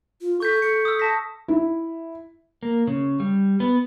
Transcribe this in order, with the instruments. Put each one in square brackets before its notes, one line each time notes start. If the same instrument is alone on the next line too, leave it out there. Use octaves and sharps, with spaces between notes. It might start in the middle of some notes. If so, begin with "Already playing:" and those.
[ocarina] F4
[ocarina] A4 [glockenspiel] C#6 G6 B6
[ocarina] A4 [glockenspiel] C#7
[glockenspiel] D#6 E6
A5 A#6 B6
[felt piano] E4
[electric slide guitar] A#3
C#3
G3
B3